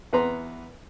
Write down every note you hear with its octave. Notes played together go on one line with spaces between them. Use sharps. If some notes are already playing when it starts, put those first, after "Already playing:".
E2 B3 B4 A#5 C6